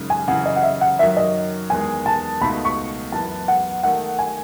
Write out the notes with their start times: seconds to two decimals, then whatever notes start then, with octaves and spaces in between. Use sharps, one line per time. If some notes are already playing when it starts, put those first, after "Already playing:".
Already playing: F#2 C#3 G#3 D#4
0.10 G#5
0.27 F#2 C#3 E3 F#5
0.46 D#5
0.56 F#5
0.63 E5
0.81 F#5
0.99 F#2 D#3 F#3 E5
1.17 D#5
1.70 E2 D#3 G#3 G#5
2.06 A5
2.41 C#2 B2 A3 D#4 F#4 B5
2.65 C#6
3.12 F#2 E3 B3 A5
3.48 F#5
3.83 D#3 A3 D#4 F#5
4.19 G#5